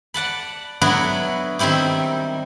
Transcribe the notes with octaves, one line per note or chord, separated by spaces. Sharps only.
D5 F#5 A5 B5
F#3 B3 D4 E4 F#4 B4
D#3 G3 C4 E4 G4